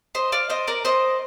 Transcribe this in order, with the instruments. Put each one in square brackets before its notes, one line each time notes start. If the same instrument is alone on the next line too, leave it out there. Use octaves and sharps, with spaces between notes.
[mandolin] C5 D#5
D5 F5
C5 D#5
A#4 D5
C5 D#5